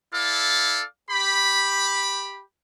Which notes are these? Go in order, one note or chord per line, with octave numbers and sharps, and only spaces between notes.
E4 A4 D5 F5
G4 B5